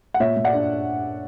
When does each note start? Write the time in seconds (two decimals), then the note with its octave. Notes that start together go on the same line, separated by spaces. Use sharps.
0.14 F#5
0.20 A#2 C#5 E5
0.37 A#2
0.44 D5 F#5
0.54 D4